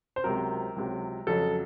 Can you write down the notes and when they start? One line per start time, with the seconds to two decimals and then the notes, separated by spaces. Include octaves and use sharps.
0.16 C5
0.24 C#2 C3 F#3 A#4
0.76 C#2 C3 F#3
1.27 F2 C#3 F#3 A4